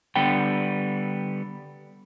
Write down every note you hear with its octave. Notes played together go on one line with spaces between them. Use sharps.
D3 G3 B3 G5